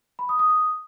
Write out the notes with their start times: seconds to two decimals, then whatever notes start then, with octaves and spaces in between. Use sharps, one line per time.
0.19 B5
0.29 D#6
0.39 D#6
0.50 D#6